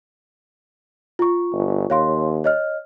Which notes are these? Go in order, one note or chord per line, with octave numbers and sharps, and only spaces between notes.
F4 C#6
G1
D#2 C#5 F5 C6
C#5 D#5 F6